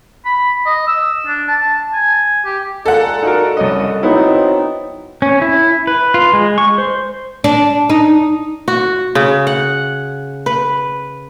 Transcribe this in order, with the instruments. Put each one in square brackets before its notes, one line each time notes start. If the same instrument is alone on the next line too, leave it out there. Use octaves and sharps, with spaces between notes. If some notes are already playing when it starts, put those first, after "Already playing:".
[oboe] B5
D#5
E6
D4
A5
G#5
G4
[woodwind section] A#2 G#3 [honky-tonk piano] A4 F#5
[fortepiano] D#4 F#4 A#4
[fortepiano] C2 D#5 [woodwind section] F#2
[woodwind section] F#3 C4 [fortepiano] B3 E4 [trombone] D#4
[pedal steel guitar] C#4
E4
B4
F4
G#3
C#6
C5
[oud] D4
D#4
[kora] F#4
C#3
F#5
B4